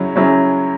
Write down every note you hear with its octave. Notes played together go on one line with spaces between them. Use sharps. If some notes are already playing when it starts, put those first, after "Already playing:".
Already playing: F#2 C#3 F#3 C#4 E4
F#2 C#3 F#3 C#4 E4